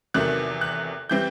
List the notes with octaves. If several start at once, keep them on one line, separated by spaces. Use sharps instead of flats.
E2 C3 D#3 F#3 A3 F#6
F#6
E3 G3 C4 G6